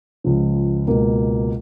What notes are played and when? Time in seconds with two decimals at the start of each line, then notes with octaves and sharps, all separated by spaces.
0.24 C#2 C#3 F3
0.87 C#2 B2 A#3